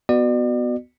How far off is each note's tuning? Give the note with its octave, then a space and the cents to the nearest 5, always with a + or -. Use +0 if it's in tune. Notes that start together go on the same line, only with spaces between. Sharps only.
B3 +0 F#4 +0 D5 +40